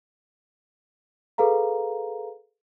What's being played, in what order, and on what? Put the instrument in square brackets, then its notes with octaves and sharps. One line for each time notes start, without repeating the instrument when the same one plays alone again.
[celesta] G#4 A4 B4 F5 A#5